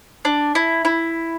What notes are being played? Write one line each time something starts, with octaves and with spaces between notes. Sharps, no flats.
D4
E4
E4